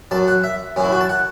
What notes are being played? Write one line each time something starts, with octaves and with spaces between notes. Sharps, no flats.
F#2 F#3 A5
F#5
E5
F#2 F#3 C#4 E4
F#4
A5
F#5